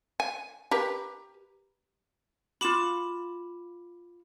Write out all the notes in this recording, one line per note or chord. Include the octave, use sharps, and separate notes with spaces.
G#5
G4 A#4 B4
F4 F#4 B5 D6 E7